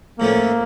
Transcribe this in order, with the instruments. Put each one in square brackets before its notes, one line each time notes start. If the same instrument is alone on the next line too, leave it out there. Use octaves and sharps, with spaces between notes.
[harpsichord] A2 F3 A3 C#4 [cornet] A#3